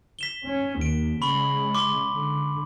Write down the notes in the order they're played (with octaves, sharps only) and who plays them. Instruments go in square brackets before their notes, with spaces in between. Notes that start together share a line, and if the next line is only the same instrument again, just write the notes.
[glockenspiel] B6 E7 G7
[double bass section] C#4
[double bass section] D#2 [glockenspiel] D7
[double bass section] C#3 G#3 [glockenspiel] B5 C#6 F#7
[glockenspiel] C6 D6
[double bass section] D3